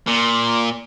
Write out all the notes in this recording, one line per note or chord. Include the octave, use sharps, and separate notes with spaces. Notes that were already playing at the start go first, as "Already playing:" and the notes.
A#2